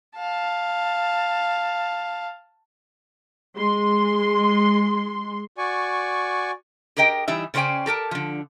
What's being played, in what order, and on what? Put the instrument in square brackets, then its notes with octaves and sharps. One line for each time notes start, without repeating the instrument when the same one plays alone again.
[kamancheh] F5 A5
[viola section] G#3 C6
[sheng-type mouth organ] F#4 D5 G#5 C#6
[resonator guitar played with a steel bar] G4 G#4 A#4 D#5 G5
E3 G3 D#4 E5
C#3 C#4 C5 D5 G5 G#5
G4 A4 A#4 A5
D3 F3